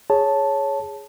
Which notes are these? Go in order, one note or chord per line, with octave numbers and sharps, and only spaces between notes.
G#4 C#5 A5